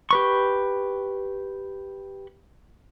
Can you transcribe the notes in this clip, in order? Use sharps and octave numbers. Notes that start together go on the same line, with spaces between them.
G4 B4 C#6